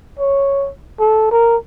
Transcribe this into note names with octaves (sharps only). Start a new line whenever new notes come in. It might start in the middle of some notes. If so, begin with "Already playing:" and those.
C#5
A4
A#4